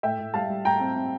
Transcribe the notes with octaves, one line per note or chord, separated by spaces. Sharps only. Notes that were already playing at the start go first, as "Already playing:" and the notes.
A2 E5 G5
A2
G3 F5 A5
G3
A2 G5 A#5
C4
C4